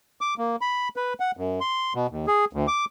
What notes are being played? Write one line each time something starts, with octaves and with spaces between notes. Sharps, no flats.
D6
A#3
B5
B4
F#5
F#2
C6
B2
D#2
G#4
D2
D6